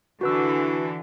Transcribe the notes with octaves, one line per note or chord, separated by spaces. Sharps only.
D3 E3 F#4 B4 E6